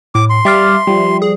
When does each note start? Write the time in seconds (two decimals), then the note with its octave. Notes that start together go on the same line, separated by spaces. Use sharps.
0.15 A2 D6
0.30 C6
0.45 G3 D5 E5 F5
0.87 F3 G3
1.22 G#4